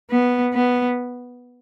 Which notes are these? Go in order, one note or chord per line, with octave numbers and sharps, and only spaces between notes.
B3
B3